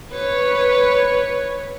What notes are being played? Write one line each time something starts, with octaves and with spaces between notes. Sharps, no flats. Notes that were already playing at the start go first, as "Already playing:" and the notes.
B4 C#5